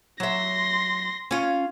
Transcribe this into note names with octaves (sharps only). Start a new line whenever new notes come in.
F#3 E5 C6 A#6
C#4 F4